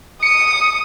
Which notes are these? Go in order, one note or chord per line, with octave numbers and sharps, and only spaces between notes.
D#6 C#7